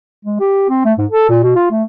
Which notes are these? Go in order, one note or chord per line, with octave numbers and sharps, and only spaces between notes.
G#3
G4
C4
A3
G#2
A4
A#2
B2
F4
A3